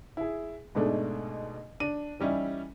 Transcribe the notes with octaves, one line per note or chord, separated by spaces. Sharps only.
E4 G#4
G#2 B2 G#3 A3 D4
D4 D#7
E3 G3 C#4 D#4 E4